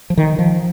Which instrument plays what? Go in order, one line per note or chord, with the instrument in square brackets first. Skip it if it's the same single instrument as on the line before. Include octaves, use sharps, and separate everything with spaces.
[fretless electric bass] F3
D#3
F3